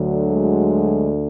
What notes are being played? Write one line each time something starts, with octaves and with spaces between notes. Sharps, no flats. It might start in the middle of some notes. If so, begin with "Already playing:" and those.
Already playing: D2 D3 F#3
G#3